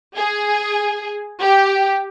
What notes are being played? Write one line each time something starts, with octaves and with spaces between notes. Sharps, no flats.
G#4
G4